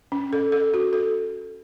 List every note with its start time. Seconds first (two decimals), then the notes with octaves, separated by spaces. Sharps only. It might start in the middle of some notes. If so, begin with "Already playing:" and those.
0.12 C#4
0.33 A4
0.52 A4
0.74 F#4
0.93 A4